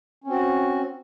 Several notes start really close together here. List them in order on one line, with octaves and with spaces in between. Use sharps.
C#4 C4 F#4